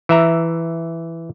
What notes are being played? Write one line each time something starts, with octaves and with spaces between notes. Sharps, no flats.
E3 E5 A#5